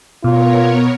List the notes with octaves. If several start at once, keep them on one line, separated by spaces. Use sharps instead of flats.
B2 B3 F4 A#4 C#5